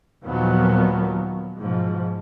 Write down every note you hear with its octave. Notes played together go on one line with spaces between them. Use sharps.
D#2 A#2 F3 F#3 B3
G#2 B2 F3